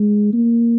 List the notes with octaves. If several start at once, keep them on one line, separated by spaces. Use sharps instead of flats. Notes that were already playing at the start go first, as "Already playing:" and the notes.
Already playing: G#3
A#3